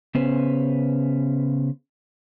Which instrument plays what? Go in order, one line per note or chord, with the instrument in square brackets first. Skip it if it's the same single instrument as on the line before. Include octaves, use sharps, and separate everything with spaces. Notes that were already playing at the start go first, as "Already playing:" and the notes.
[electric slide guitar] C#3 B3 C#4 B4 C5